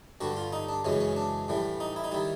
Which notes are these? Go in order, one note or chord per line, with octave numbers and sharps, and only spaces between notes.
G2 D3 G3 F#4
F4
D#4
D4
F#2 C#3 E3 G#3 C#4
C#4
D4
A2 E3 G3
D#4
E4
D#4
D#3 G3 E4